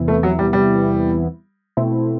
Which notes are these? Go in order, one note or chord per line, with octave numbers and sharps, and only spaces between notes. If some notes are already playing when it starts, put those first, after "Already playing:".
Already playing: E2 C3 E3 B3 E4
A3
F#3
G3
G3
B2 A3 C4 E4